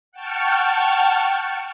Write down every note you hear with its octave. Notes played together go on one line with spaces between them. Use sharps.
F#5 G5 A5 C#6 F6